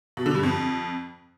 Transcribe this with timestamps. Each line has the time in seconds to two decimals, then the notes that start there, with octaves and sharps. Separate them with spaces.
0.17 B2
0.26 D3
0.34 G2
0.43 F2